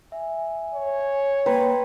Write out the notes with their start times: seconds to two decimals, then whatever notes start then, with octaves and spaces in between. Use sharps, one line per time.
0.12 E5 G#5
0.74 C#5
1.46 A#3 B4 G5 A#5 C6